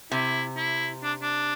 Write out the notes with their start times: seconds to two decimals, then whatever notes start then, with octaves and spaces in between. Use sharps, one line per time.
0.12 C3 E4
0.57 E4
1.03 D4
1.22 D4